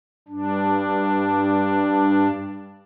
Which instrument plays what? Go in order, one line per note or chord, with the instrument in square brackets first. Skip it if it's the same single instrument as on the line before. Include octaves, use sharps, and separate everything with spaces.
[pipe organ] G2 D4